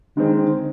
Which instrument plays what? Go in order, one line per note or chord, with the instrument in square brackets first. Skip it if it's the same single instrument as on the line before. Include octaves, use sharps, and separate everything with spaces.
[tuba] D3 [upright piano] D#3 G#3 C4